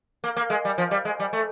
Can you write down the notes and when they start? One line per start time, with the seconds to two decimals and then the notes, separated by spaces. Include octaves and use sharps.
0.24 A#3
0.37 A#3
0.50 G#3
0.65 G3
0.78 F3
0.91 G3
1.05 G#3
1.20 G3
1.33 A3